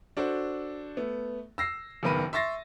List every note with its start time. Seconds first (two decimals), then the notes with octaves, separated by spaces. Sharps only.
0.17 D4 F#4 A4 C5
0.97 A3 B3
1.58 E6 A#6 C7
2.03 F#1 B1 D#3 B3 B5 D#7
2.33 E5 C6 C#6 A6 A#6 C7